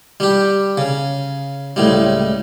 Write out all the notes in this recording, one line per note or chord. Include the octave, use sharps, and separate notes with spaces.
G3 G4
C#3
C#2 A2 G3